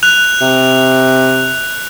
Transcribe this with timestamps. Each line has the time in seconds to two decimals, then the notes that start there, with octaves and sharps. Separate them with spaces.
0.03 F#6 F7
0.41 C3